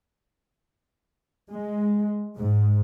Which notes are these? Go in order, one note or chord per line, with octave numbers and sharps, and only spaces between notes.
G#3
G#2